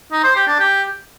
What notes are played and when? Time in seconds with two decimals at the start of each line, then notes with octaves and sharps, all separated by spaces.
0.12 D#4
0.24 C5
0.36 G4
0.48 D4
0.59 G4